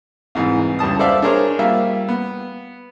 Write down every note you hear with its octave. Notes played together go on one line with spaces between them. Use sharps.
C2 G#2 E3
C#2 G3 A5 D#6
A4 C5 D5 E5 F5
D4 G#4 A#4 C5 C#5
G3 A#3 F4 E5
B3